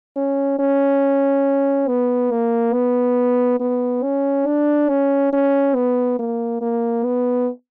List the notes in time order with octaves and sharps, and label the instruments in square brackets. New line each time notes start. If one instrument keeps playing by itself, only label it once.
[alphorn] C#4
C#4
B3
A#3
B3
B3
C#4
D4
C#4
C#4
B3
A#3
A#3
B3